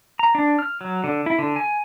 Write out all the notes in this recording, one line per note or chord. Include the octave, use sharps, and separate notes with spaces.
A#5
D4
F6
F#3
D3
E4
D3
G#5